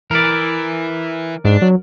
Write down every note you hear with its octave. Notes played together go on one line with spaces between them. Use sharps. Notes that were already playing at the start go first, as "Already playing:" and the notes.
E3 A#4 D5
G#2 D4
F#3